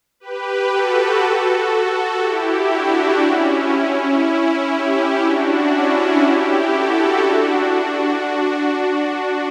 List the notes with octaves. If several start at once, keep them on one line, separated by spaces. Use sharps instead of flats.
G4 B4
F#4 A4
F#4 A4
E4 G4
D4 F#4
C#4 E4
C#4 E4
E4 G4
D4 F#4
C#4 E4
E4 G4
F#4 A4
D4 F#4